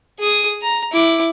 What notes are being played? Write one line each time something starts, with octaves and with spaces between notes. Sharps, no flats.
G#4 D#6
A#5
E4 D6